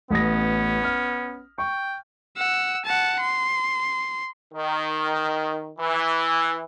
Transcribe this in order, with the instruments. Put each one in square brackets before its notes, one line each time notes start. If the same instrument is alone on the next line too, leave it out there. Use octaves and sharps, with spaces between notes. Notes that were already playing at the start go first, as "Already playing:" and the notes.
[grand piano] A1 D#6 A#6 [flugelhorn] B3 [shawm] C#4
[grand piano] F6
[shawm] G5 [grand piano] C#6
[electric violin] F#5 E6
F#5 A5
C6
[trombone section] D#3
E3